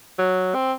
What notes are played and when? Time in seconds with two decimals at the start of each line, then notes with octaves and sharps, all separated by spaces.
0.19 F#3
0.55 C4